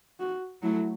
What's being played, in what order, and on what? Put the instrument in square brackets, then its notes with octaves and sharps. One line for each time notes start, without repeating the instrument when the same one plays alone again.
[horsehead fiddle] F#4
[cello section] F#3 A3 [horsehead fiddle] E4